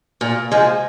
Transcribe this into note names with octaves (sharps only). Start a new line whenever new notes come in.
A#2
F3 G#3